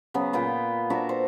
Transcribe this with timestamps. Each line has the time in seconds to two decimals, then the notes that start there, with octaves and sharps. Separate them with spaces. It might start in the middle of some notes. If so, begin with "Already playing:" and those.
0.14 C#3 F#3 B3
0.33 A#2 B3 F4 G5
0.90 D4 F#4 E5 A#5
1.09 C5